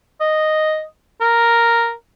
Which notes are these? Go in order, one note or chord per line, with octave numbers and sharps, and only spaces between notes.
D#5
A#4